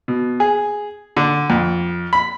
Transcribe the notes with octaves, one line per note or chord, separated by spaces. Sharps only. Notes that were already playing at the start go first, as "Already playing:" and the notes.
B2
G#4
D3
F2
B5